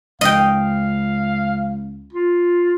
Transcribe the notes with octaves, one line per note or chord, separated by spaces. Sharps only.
C#2 D#5 F5 G5
F4